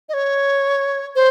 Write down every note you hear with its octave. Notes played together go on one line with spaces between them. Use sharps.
D#5
C#5
C5